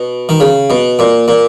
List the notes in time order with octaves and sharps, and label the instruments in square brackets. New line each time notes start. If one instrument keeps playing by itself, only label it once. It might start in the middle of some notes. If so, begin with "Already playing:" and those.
Already playing: [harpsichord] B2
D#3
C#3
B2
A#2
A#2